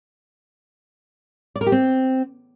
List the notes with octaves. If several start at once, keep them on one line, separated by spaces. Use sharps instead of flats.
D5
A#4
G4
C4